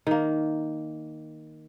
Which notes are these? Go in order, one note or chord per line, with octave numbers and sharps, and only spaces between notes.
D#3 A#3